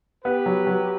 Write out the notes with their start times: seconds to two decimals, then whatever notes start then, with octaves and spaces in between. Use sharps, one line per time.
0.24 B3 G4 B4
0.46 F#3
0.67 F#3